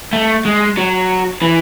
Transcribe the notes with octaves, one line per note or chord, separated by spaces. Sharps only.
A3
G#3
F#3
E3